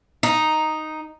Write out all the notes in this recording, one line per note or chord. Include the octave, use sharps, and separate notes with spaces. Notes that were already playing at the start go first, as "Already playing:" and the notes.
D#4